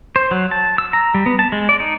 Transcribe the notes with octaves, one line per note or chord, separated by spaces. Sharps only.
C5
F#3
A5
E6
A#5
G3
B3
A5
G#3
D5
D#4